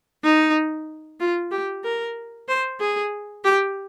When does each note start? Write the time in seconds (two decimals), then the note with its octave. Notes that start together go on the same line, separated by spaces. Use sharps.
0.24 D#4
1.20 F4
1.52 G4
1.84 A#4
2.48 C5
2.80 G#4
3.44 G4